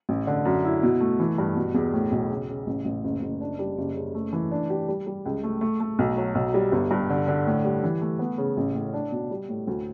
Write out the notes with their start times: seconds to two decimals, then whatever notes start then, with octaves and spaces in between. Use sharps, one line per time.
0.09 A1
0.27 D3
0.45 F#2
0.65 E4
0.83 B2
1.00 A3
1.20 E3
1.38 G2
1.56 B2
1.74 E2
1.94 A2
2.12 B1
2.30 C#3
2.49 C#3
2.67 A1
2.85 A1
3.04 F#1
3.22 F#1
3.41 D4
3.59 G3
3.78 F#1
3.96 C#3
4.14 A3
4.33 E3
4.51 D4
4.70 G4
4.88 G3
5.07 G3
5.26 C#2
5.43 A3
5.61 A3
5.80 A3
5.99 B1
6.17 F#3
6.35 B1
6.54 G3
6.72 G1
6.91 G2
7.10 D3
7.28 D3
7.47 A2
7.65 G3
7.83 E3
8.02 A3
8.19 B3
8.38 C#3
8.57 A1
8.75 A2
8.94 D4
9.12 B2
9.31 G3
9.49 A2
9.67 D2